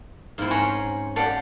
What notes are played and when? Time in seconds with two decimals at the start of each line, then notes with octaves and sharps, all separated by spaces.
0.38 G#2 C4 E4 F5
0.51 C#4 C5 C#5 F#5 G#5 A#5
1.16 G4 A4 D5 F5 F#5